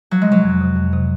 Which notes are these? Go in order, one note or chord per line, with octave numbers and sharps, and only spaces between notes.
F3 F#3
G#3
C3 F#3
F2
C3
F2
C3